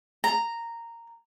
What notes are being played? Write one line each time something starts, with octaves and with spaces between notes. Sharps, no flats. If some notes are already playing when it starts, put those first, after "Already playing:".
A#5